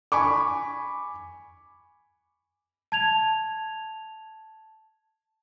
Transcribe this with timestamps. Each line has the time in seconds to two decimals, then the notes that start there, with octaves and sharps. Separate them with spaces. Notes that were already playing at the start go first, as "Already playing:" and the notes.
0.12 G#5 B5 C#6 D6
2.92 A5 G#6 F7